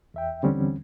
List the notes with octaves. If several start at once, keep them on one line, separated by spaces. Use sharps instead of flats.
E2 E5 G5
D#2 D3 E3 G3 C4 C#4